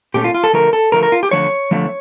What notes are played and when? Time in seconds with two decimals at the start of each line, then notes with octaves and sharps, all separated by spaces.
0.14 A#2 A3 C#4 G4
0.24 F4
0.34 F4
0.44 A4
0.53 D3 F3 A3 A#4
0.73 A4
0.92 D3 F3 A3 A#4
1.03 A#4
1.12 F4
1.23 G4
1.31 D3 F3 A3 C#5
1.71 D3 F3 A3